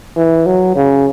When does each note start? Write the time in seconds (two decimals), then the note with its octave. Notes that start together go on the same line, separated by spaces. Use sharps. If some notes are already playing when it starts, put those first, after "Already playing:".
0.17 E3
0.46 F#3
0.76 C#3